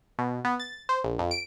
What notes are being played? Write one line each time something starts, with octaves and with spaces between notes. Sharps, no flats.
B2
B3
A6
C5
A#1
F2
D7